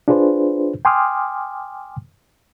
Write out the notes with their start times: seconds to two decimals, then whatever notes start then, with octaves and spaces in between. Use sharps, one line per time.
0.08 D4 F4 G#4 B4 C5
0.85 G5 G#5 C6 D6 D#6 F6